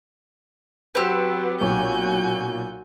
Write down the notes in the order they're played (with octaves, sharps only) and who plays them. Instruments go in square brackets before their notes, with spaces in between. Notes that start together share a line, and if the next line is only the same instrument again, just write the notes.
[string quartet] F#3 B3 [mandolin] C4 G4 [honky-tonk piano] B4 E6
[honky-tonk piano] B1 A#2 C#5 [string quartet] F#4 G#5 G6